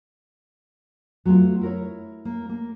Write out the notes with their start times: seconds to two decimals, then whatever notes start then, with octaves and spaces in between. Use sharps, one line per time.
1.25 F#3 A3 B3 F4
1.61 E4 A#4 C#5
2.25 A#3
2.49 A#3